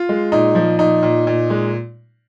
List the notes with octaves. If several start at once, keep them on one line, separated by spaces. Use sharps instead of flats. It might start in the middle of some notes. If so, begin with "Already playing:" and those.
Already playing: F4
G#3
A#2 D#4
F3
A#2 D#4
A#2
A#2
G#3